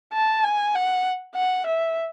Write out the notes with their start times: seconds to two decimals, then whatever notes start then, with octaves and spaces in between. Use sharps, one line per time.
0.13 A5
0.44 G#5
0.75 F#5
1.36 F#5
1.66 E5